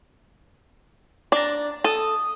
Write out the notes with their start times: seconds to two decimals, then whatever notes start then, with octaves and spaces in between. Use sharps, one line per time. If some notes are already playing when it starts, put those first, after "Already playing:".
1.32 D4 D5 A#5
1.84 A4 D#6